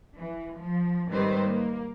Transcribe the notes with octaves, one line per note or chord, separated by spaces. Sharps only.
E3
F3
G#2 D#3 G3 C4 B4 C5
A#3